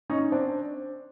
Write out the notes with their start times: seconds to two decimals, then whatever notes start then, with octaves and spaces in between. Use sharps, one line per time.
0.10 C#4 D#4
0.32 C4 D4